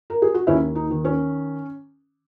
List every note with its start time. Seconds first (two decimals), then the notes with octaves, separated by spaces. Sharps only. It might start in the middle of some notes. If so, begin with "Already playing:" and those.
0.10 A#4
0.22 G#4
0.34 F#4
0.47 D#2 C#4 E4
0.75 D#4
0.90 D#3
1.05 C#4